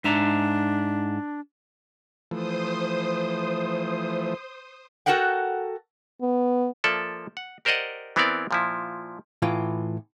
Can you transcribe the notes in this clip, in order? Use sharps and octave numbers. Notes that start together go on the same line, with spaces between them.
G#2 D4 E5 A#5
E3 F3 A3 C5 D#6
F#4 A4 A#4 F#5 G5
B3
F3 A#3 A4 D5 E5
F#5
G4 A#4 C5 D5 D#5 F#5
E3 B3 C4 E4 A#4 D5
A#2 F3 E4
A2 E3 F4